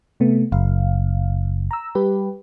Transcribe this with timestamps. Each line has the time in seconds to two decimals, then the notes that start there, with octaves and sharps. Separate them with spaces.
0.20 C3 A3 B3
0.52 F#1 F5
1.71 A#5 E6
1.95 G3 G4 B4